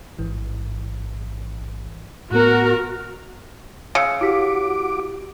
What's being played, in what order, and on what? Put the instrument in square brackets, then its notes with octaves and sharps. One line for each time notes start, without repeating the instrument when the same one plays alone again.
[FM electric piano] A1 G#2 E3
[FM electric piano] A2 B3 [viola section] F#4 A#4
[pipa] C#3 [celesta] E6 C#7
[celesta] E4 G4 B6 [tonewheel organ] F#4 D6